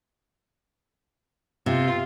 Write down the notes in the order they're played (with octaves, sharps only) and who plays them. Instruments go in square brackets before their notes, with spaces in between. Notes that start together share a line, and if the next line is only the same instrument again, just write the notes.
[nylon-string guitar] C3 [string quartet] F4